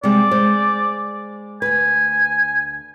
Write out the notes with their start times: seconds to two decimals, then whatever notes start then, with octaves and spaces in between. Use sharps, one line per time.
0.04 C3 G3 G#3 D5
0.31 G#3 C5
1.62 D2 B4 G#5